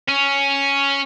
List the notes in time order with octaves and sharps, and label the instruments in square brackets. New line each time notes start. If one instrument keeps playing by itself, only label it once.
[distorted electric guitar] C#4